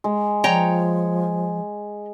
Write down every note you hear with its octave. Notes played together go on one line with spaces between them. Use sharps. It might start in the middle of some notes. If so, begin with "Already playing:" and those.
G#3
F3 C#5 G5 A#5